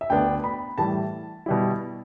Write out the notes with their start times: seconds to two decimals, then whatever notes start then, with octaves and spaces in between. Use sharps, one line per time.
0.01 E5
0.10 D2 D3 B3 D4 G5
0.44 B5
0.78 A2 E3 G3 A5
1.46 B2 G3 E4